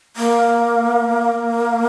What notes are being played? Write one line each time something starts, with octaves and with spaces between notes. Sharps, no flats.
A#3